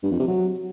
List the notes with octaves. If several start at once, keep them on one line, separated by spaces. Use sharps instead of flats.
G2
F2
C3
F#3